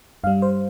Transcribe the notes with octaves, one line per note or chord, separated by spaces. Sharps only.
G2 G3 F5
C5